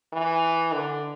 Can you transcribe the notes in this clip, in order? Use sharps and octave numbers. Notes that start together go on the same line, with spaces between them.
E3
D3